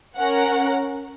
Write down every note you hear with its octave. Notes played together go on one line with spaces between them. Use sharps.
C#4 A#4 F#5